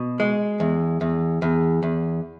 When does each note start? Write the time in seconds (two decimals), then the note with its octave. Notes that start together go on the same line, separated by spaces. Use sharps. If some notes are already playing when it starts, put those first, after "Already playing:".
Already playing: B2
0.20 G#3
0.60 E2
1.01 E2
1.42 E2
1.83 E2